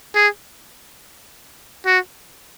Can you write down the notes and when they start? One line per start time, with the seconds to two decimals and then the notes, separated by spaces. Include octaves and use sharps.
0.15 G#4
1.86 F#4